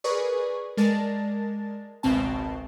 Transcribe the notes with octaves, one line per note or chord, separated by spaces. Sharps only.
G#4 A#4 B4 D5 C#6
G#3 A#4 D5 A5 A6
G#1 C#2 B2 C4 A5